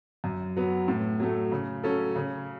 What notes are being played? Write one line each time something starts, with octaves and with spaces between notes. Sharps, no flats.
F#2
F#3 B3
A2
F#3 A3
C#3
F#3 C#4 A4
C#3